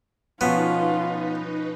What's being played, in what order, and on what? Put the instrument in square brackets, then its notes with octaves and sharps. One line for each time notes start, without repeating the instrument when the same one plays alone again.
[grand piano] B2 F3 C#4 [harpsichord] B3 [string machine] D#4 B4 [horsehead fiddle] F4